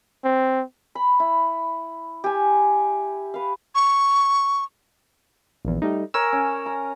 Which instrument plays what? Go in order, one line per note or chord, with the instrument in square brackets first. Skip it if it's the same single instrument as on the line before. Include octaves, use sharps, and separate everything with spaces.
[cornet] C4
[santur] B5
E4
G4 G#5
B4 F5
[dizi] C#6
[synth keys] A#1 E2
G3 A3 D#4
[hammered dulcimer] A#4 C#5 G#5 [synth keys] E6
[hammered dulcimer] C#4
A#5